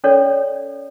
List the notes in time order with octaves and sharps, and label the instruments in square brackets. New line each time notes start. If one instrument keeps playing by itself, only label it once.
[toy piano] C#4 A4 C#5 D5